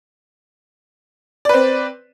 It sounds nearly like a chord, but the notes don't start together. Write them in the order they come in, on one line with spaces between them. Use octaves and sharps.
D5 B4 C4